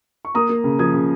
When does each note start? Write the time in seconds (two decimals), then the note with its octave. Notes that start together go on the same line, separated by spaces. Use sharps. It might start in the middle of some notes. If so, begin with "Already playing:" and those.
0.25 C#6
0.35 A#3 A#5 D#6
0.49 A#3
0.64 C#3
0.79 F3 D#6 G#6
0.94 C#3